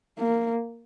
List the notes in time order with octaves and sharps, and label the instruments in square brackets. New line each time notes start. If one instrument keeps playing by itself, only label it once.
[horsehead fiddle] A#3